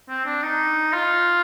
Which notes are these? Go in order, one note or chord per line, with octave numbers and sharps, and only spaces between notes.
C4
D4
D#4
F4